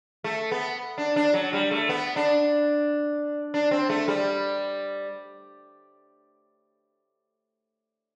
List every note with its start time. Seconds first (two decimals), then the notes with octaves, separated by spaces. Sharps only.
0.24 A3
0.51 B3
0.98 D4
1.16 D4
1.34 F#3
1.53 G3
1.71 A3
1.89 B3
2.16 D4
3.54 D4
3.71 C4
3.89 A3
4.08 G3